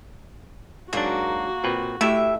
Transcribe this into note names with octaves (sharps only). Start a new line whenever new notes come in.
G#2 F#3 A#3 D4 F#4
A#2 C4 B4
A2 A3 E4 G4 E5